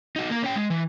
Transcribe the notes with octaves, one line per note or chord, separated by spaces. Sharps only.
D#4 F#4
A#3 A#4
C#4 G5
G#3
E3